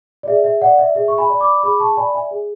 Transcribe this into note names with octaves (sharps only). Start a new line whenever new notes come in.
D5
G#4 E5
E5
D5 F#5
E5
G#4 E5
C#6
G#5 B5
D5
B5 D6
G#4 B5 D6
A5 C#6
D5 G#5 B5
E5 G#5
G#4